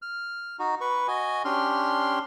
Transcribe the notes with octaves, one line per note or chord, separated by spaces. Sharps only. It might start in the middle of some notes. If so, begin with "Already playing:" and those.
F6
D#4 F#4
B4 C#6
F#4 D#5 G#5
C#4 D4 G4 C6 F6